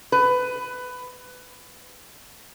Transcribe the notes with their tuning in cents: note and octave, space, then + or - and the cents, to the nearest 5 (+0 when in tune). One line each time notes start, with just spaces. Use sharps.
B4 +15